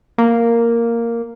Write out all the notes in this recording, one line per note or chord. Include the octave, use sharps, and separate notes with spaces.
A#3